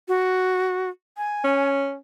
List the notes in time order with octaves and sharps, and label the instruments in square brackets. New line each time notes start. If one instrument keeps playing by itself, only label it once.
[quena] F#4
G#5
[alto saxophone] C#4